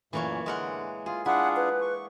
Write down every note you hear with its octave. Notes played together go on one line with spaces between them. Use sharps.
F#2 A#2 E3 A3 A#3 C#5
D3 G#3 A#4 F#5
F4 G#4
D4 E4 F4 G#4 F#5
B4
C#6